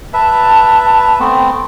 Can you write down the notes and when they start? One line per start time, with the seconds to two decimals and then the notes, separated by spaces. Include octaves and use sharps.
0.13 B4 E5 A5
1.20 A3 B3 C4 G5